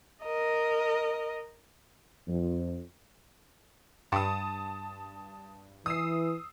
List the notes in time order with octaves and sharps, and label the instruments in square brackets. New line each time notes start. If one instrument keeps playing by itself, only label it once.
[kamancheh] A#4 D#5
[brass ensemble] F2
[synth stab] G2 [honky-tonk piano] A5 D#6
[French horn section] E3 [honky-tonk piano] D#6 E6 C7